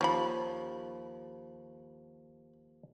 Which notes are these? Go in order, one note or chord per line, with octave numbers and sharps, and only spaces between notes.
D#2 F3 C#4 B5